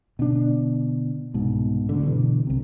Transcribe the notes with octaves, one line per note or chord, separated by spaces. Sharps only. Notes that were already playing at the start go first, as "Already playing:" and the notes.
B2 D3 D4
C2 G#2 B2
D#1 D2 D3
G2 B2 D3 E3
C2 C3